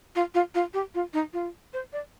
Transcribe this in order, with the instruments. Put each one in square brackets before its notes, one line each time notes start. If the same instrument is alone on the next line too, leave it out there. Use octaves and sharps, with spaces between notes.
[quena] F4
F4
F4
G4
F4
D#4
F4
C5
D5